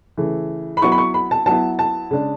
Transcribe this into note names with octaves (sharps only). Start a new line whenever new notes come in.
C#3 E3 A3
B5
F#3 B3 E4 C#6
B5
C#6
B5
A5
F#3 B3 E4 A5
A5
C#3 G#3 D4